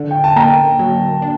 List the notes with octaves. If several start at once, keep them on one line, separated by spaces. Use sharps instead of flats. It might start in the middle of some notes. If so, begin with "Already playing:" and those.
Already playing: D3
G5
A5
A#3 G5 A#5
F#3
D4